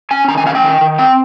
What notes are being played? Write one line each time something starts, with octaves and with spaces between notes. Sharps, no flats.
C#4 G#5
D#3 A#5
G#5
C#4 F5
G5
D#3
D#3
C4 G5